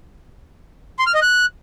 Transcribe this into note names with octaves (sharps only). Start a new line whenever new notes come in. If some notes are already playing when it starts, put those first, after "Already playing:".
C6
F6
D#5
F#6